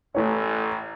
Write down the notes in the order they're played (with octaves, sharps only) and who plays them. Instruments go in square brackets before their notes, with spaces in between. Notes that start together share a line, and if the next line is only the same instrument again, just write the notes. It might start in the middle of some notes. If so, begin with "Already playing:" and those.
[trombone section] A1 [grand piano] A3 E4 C#5